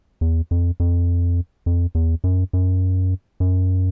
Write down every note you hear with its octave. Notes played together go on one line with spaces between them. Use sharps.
E2
F2
F2
F2
E2
F#2
F#2
F#2